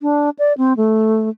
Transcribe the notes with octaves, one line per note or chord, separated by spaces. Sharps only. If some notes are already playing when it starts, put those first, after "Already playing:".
D4
D5
C4
A3